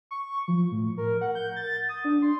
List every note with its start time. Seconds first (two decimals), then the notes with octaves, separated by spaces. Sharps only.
0.11 C#6
0.48 F3
0.72 A2
0.98 A#4
1.21 F#5
1.35 G6
1.56 A6
1.89 D#6
2.05 D4
2.22 C6